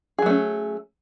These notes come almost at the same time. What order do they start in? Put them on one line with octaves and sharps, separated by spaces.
G#4 F#3 A3 C#4